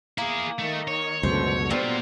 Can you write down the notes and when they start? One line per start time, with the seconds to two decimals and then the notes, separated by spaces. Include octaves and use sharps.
0.18 A#3 E4 G#4
0.59 D#3 A3 D#5
0.88 C#5
1.23 C#2 F#2 B2 D3 A3 B3 C5
1.70 F#3 G3 A#3 B3 F4 G4 C5